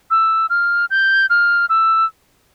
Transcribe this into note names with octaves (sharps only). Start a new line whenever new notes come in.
E6
F6
G6
F6
E6